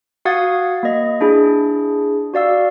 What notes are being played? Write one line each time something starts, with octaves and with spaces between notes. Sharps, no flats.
F#4 F5 F#5 D#6 G#6 A6
A#3 D#5
D4 E4 G#4
F#4 D5 F5 E6